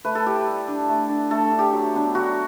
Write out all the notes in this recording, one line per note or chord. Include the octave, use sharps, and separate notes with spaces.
A3 B4
A4
E4 G4
G3
D4
A3
D4
A3 A4
D4
G4
F#3
B3 D4
F#3 F#4